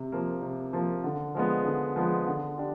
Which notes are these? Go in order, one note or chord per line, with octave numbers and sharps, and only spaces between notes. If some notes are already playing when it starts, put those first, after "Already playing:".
Already playing: C3
F3 A#3
C3
F3 A#3
D3
F3 G#3 B3
D3
F3 G#3 B3
D3
D4 G4